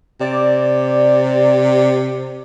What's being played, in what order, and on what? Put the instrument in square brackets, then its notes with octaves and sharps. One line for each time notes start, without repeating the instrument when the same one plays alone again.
[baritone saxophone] C3 [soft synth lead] D5